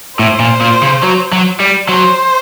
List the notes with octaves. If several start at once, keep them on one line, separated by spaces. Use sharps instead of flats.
A2 C5
A#2
A#2
C#3
F#3
F#3
G3
F#3 C5